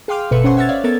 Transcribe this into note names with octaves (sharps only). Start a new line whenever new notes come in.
G#4 F5 G5 C6 D6 F6
G1 B2 A4 B4 E5 C#7
C#4 C5 F#5 G#5 C6 C#6
E5 F#5 E6 F6 G#6 A6
C#5 D5 E5 F5
B3 A4 A#4 E5 G#6 A6